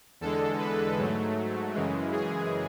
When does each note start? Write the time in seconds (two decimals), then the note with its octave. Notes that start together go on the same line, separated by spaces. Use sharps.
0.21 E2 D3 G#3 A4
0.59 B4
0.98 G#2 F#3 A3
1.74 F#2 C#3 E3 G#3
2.12 G#4